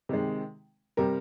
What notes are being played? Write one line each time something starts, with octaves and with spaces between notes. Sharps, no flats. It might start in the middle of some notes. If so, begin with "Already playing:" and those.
C3 D#3 G#3
C3 G3 A#4